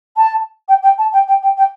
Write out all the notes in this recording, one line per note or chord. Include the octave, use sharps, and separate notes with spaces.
A5
G5
G5
A5
G5
G5
G5
G5